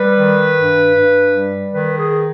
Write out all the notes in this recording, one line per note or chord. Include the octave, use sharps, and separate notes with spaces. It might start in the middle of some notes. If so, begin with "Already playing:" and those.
Already playing: G3 B4
D#3
G2
G2
G3
D#3 B4
G#4